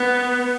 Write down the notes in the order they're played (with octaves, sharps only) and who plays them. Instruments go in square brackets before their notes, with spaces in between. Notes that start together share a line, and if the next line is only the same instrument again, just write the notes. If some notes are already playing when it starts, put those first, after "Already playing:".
Already playing: [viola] B3